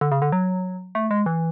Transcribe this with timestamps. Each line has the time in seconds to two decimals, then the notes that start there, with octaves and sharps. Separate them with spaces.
0.01 D3
0.12 C#3
0.22 D3
0.32 F#3
0.95 A3
1.11 G#3
1.26 E3